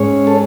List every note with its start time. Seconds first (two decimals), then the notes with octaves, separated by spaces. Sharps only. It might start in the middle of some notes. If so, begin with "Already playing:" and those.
Already playing: G#2 G#3 C#4 C#5
0.27 A4